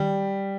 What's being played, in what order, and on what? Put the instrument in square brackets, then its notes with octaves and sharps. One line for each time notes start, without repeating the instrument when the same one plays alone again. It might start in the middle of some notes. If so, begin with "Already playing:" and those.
Already playing: [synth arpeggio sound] D#3 [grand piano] G3